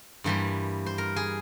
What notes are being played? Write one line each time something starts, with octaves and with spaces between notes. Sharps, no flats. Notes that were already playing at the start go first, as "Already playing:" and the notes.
G2 E3 G3 A#3 C5
C5
A#4
G#4